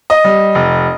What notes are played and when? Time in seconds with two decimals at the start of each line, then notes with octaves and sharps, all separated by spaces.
0.10 D#5
0.24 G3
0.55 F1